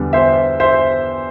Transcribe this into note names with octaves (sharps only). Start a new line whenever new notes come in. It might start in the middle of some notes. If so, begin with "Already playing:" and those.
Already playing: E2 D3 G3 B3 D4
C5 E5
C5 E5